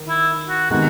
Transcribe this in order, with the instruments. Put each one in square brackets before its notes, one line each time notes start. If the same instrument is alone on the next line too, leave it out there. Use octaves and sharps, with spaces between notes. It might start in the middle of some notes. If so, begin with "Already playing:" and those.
Already playing: [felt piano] D#3
[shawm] E4
F#4
[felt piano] C3 D#3 G#3 B3 D#4 [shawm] F#4